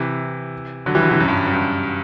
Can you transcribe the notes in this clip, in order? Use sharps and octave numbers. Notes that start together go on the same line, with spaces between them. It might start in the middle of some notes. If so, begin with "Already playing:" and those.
Already playing: C3 E3
D3 F#3
E3 G3
D3 F#3
C3 E3
F#2
G2
F#2
G2